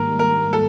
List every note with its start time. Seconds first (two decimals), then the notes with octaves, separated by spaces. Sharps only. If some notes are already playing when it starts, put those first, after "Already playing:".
Already playing: G#2 D#3 G3 A#3 A#4
0.19 A#4
0.53 A4